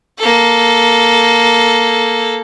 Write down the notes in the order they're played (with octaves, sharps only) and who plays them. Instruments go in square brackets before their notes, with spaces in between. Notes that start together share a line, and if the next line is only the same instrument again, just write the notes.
[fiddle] A#3 A4